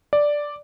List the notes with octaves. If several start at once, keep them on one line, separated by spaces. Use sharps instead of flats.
D5